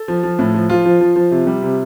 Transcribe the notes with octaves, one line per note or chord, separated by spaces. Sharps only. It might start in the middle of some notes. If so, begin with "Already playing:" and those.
Already playing: A4
F3
F3
A2
F3
F3 F4
F3
F3
F3
C3
G3
C3